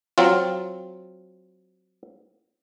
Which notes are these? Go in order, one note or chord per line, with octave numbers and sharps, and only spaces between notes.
F#3 C4 F4